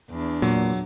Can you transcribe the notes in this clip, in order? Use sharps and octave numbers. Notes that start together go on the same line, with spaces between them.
E2 D4
A#2 F#3